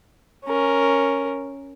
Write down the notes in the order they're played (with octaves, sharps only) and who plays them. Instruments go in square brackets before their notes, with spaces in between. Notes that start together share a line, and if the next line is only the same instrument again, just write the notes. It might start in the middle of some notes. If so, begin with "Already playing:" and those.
[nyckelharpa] C#4 A#4